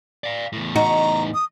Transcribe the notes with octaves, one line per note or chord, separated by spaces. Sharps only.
D5 F5
E2 A2
D#4 F#4 A#5
D#6